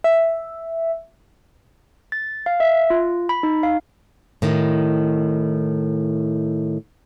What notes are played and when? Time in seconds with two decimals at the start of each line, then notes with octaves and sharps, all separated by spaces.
0.04 E5
2.12 A6
2.46 F5
2.60 E5
2.90 F4
3.29 B5
3.43 D#4
3.63 F5
4.42 A2 D#3